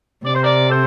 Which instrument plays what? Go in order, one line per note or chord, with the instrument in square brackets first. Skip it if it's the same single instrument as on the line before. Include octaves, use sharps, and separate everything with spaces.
[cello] C3 [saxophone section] D5
[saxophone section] C5
A#4 D5
A4 C5